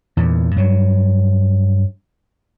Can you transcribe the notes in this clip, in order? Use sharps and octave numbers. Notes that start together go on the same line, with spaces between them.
E2 A#2
G2 F#3